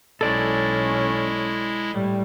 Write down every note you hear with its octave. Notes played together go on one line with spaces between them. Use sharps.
B1 G#3 C#4 E4 A4 D5
A2 G3